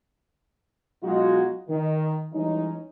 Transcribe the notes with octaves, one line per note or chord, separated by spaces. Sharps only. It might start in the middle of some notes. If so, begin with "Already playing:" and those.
B2 F#3 G#3 D#4 F4 F#4
D#3
E3 G3 G#3 C#4 D#4